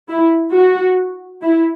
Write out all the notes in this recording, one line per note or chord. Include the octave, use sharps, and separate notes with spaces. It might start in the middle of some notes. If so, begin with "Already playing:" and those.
E4
F#4
E4